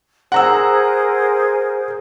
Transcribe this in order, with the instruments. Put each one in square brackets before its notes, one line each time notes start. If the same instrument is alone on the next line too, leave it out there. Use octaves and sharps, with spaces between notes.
[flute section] G#4 A#4 C5 [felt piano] F#5 A#5 E6